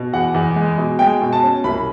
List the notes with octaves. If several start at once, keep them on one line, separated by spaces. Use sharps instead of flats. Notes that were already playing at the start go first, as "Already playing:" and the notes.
Already playing: B2
E2 F#5
E2
G#3
B2
G#3 G5
B2
A5
C#4
C2 B5